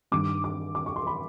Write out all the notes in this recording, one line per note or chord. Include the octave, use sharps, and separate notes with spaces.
G2 D#3 G3 D6
D6
D6
C#6
C6
B5